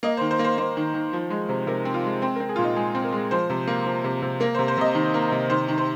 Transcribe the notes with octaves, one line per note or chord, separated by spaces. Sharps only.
A#3 D#5
C5
D#3
C5
A#3
C5
A#3 C5
D#3
D#3
F3
G#3
C3
C3 A#4
C4
F4
G#3
C4 C5
A#4
C4
G#4
F4
A#2 D#4
G#3 G#4
C4
A#4
G#3
F3 C5
C3
A#3
F3
C3
C3
A#3 A#4
C5
C3
C5
C3 D#5
D#3
A#3
C3
D#3 C5
D#3
C5